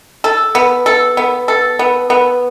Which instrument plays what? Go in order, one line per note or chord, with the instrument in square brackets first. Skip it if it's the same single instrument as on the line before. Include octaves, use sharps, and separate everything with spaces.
[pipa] A4
B3
A4
B3
A4
B3
B3